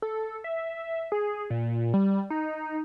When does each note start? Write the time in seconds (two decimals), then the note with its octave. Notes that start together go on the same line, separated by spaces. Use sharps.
0.02 A4
0.44 E5
1.12 G#4
1.50 A#2
1.94 G3
2.30 D#4